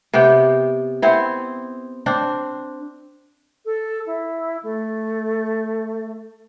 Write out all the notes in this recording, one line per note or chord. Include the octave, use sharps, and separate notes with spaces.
C3 B3 G4 G5
B3 C4 E4
C4 D4
A4
E4
A3